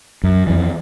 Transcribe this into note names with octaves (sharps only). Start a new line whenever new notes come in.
F#2
F2 E3